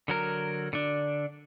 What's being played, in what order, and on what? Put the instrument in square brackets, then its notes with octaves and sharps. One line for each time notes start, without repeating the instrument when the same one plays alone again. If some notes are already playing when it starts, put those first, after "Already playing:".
[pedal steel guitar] D3 F#3 A#4
D3 D4